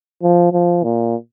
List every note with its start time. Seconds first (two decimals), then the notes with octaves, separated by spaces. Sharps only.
0.23 F3
0.53 F3
0.83 A#2